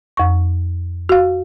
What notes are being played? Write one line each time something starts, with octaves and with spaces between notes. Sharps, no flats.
F2 C#6
F#4 F5